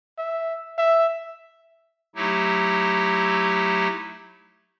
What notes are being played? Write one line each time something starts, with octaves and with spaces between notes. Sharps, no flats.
E5
E5
F#3 A3 D#4 E4 G4